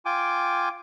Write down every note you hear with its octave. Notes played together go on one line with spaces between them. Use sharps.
F4 G5 G#5 D6